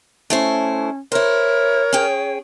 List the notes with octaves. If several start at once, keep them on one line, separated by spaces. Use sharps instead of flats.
A3 C#4 E4 C5
E4 A#4 C5 C#5
C#4 G#4 G5